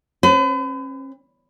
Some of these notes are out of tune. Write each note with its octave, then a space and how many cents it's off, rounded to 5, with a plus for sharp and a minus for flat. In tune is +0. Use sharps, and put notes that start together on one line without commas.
C#4 -45 B4 +40